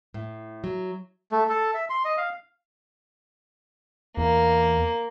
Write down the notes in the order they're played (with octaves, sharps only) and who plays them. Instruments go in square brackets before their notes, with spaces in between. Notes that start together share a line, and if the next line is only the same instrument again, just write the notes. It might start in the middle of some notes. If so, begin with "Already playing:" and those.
[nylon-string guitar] A2
F#3
[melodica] A3
A4
E5
C6
D#5
F5
[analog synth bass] E2 [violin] A#3